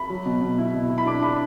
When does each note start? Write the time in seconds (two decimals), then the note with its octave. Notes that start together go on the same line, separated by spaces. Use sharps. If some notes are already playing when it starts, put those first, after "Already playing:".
Already playing: B5
0.10 F#3
0.25 B2
0.42 B2
0.58 E4
0.74 B2
0.90 E4
0.98 B5
1.06 D4 D6
1.22 D4 B5